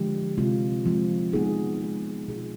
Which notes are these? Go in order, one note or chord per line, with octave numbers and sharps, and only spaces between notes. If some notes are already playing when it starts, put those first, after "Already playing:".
Already playing: D3 F3 G#3 D4 G4
C3 F3 G#3 C4 F4
C3 F3 G#3 C4 F4
G#3 B3 D#4 G#4
G#3 B3 D#4 G#4
B2 B3 F4 G#4